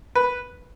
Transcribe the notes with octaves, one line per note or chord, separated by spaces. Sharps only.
B4